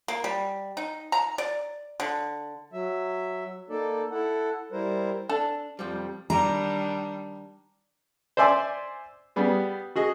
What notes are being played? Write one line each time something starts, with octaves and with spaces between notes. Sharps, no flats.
A#3
G3
D#4
A#5
D5
D3
F#3 E5
A#3 D#4 A4 D5
E4 A4 F#5
G3 E4 A#4 C5
D4 A4
F2 F3 G3
D#3 G3 D4 A#5
C5 D5 E5 G#5 C6 D6
G3 B3 G#4
F#4 G#4 D#5